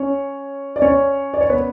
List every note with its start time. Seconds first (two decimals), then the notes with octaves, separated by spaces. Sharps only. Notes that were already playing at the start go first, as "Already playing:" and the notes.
Already playing: C#4 C#5
0.76 D5
0.82 C#4 C#5
1.34 D5
1.41 C#5
1.50 B3 B4